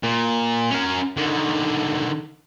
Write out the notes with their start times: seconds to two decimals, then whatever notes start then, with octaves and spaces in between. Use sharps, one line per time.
0.03 A#2
0.71 C#4 A#4
1.17 D3 D#3